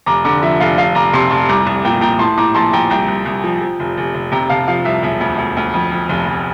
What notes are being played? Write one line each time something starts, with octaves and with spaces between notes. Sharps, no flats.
F1 A#5 D6
D3 A#5 D6
F3 E5
F1 F5
F1 F5
F1 A#5 D6
C3 A5 C6
F1 A5 C6
C2 A#5 D6
C2
A#2 G5 A#5
A#2 G5 A#5
A2 A5 C6
A2 A#5 D6
A#1 A5 C6
A#1 G5 A#5
C2 G5 A#5
C2
C2
F3
F3
F1
F1
F1
C3 G5 A#5
C3 F5 A5
F3 F5
C2 E5
E1 E5
D2
D2
D2
F2
F2
F1
F1